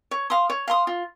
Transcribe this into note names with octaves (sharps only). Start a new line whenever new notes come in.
C#5
F5 C6 D#6
C#5
F5 C6 D#6
F4